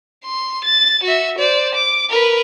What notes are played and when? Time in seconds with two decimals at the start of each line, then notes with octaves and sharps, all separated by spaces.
0.25 C6
0.65 A6
1.04 F#4 E5
1.38 C5 D5
1.75 D6
2.10 A#4 B4